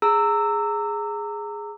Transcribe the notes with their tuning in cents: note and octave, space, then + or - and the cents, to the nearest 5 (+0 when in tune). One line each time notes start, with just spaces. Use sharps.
G#4 +0 A#5 -30 E6 +0